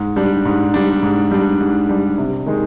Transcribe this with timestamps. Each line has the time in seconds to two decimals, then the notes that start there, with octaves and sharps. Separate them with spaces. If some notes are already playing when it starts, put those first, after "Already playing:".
Already playing: G#2
0.16 G3 D4
0.45 G#2
0.74 G3 D4
1.03 G#2
1.31 G3 D4
1.60 G#2
1.89 G3 D4
2.18 C3
2.46 D#3 G#3 D#4